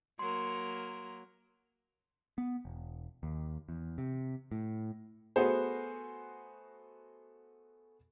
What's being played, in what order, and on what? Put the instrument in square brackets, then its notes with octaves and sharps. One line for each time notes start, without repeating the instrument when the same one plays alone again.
[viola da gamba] F#3 A#3 A#4 [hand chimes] C6
[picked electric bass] B3
E1
D#2
E2
C3
A2
[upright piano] A3 B3 F#4 G#4 C5